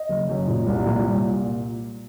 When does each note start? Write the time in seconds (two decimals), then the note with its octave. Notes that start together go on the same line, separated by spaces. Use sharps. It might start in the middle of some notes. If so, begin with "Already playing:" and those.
Already playing: D#5
0.09 F#1
0.29 F#2
0.47 A#2
0.66 C2
0.86 A#2